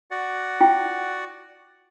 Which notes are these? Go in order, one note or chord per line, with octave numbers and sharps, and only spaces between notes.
F#4 D5 F#5
E4 F4 G5